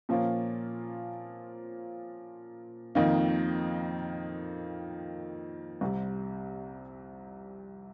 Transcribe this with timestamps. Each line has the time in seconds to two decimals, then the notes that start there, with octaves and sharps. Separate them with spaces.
0.09 A#2 F3 A#3 C#4
2.95 F2 D#3 A#3 D#4
5.81 C2 C3 G3